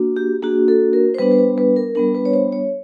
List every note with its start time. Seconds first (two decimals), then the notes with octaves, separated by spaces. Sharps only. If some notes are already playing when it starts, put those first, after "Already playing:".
Already playing: A#3 D4 F#4
0.16 G4
0.42 A#3 D4 F#4 G#4
0.68 A4
0.93 A#4
1.14 C5
1.19 G3 B3 D4 B4
1.32 B4
1.38 C5
1.58 B4
1.76 A#4
1.95 G3 B3 D4 A#4
2.15 B4
2.25 C#5
2.33 C5
2.52 C#5